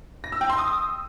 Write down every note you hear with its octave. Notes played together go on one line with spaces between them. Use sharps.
A#6
E6
G5
C6
D#6